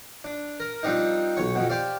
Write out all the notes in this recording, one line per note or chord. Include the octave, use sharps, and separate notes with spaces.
D4
A#4
F3 G3 C4 D4 D#4
B1 C#5 C#6
F2 B2
G4 C5 D5 F5